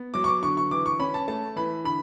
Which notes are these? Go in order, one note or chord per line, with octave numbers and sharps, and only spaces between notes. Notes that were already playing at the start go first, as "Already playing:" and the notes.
Already playing: B3
F#3 D6
C#6
D6
D3 C#6
C#6
E3 D6
C#6
C#4 B5
A5
A3 A5
E3 B5
D3 B5